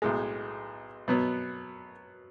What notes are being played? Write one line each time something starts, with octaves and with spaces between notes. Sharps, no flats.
B1 A2 G#3
B2 F#3 B3